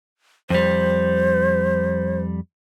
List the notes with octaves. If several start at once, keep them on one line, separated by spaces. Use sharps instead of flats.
F2 G3 C5